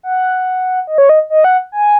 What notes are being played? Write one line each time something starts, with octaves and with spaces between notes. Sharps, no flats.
F#5
D#5
C#5
D#5
D#5
F#5
G#5